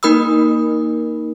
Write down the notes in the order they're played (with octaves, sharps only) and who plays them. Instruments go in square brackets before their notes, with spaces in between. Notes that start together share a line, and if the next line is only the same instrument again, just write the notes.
[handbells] A#3 D#4 A#4 B5 D#6 E6